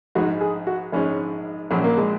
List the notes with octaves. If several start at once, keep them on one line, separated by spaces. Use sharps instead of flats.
A#1 G#2 G#3 D#4 F#4
G#4
F#4
A#1 G#2 G#3 C#4 D#4
A#1 A#2 F#3 C#4
A#3
G#3